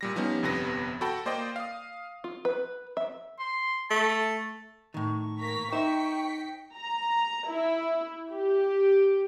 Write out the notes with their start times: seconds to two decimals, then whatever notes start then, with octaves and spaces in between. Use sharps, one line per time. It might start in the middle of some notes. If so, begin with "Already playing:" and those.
0.01 A#2 G3 A#6
0.16 F3 G3 B3 C#4 D#4
0.42 G1 F2 C3 B3 B4 A#6
1.01 F#4 A4 G5 A5 B5
1.26 A#3 C5 D5 D#5 G5
1.56 F5 D#6
2.24 F4
2.45 B4
2.97 E5
3.40 C6
3.91 A3 A5
4.94 A2 D#3 C#6
5.40 A#3 A#5 B6
5.73 D#4 C5 E5 G5 B6 C#7
6.76 A#5
7.50 E4
8.31 G4